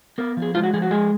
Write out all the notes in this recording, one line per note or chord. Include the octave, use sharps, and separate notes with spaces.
B3 A#4
F3
G#4
G#3 F4
F#4
F3 G#4
F#4
G#3 G#4